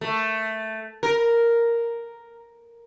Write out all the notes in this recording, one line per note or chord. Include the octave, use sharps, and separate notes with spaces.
A3
A#4